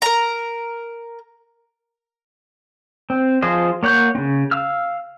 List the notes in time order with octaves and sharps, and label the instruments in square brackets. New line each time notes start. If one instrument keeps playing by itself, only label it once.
[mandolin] A#4 A#5
[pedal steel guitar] C4
F3 F4 G#4 C5 D#5
A#3 C#5 F#5 G6
C#3 C4
F5 E6 F6